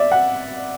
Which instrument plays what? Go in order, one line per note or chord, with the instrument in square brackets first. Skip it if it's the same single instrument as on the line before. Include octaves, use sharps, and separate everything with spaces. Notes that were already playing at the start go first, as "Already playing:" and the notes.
Already playing: [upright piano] D5 E5
F#5